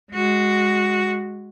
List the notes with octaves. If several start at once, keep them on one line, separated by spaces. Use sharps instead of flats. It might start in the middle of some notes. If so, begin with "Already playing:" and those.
G#3 F#4